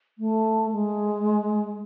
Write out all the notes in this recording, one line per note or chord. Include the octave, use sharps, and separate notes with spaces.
A3
G#3